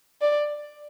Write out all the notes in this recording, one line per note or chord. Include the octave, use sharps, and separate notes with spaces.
D5